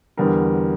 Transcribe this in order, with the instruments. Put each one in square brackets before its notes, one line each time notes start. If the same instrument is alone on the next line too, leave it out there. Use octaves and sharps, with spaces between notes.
[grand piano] E2 D3 G3 A#4